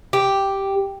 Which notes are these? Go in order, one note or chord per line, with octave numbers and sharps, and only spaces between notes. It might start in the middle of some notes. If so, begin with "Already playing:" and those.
G4